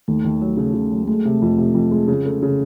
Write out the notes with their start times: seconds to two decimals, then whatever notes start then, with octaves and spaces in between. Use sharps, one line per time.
0.08 D#2 A3
0.24 D#2
0.41 F#3
0.57 C#3
0.74 C#3
0.91 F#3
1.08 G#3 A3
1.25 C3
1.42 F2
1.58 C3
1.75 F2
1.91 G#3
2.08 C#3
2.26 A3
2.42 C#3